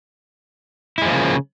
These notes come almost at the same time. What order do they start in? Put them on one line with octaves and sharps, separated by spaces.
E4 G#3 F3 A#3 C#3